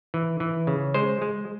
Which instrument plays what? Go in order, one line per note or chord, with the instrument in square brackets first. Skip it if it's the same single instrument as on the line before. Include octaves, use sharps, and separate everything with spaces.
[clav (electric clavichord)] E3
E3
C#3
G#3 C5
G#3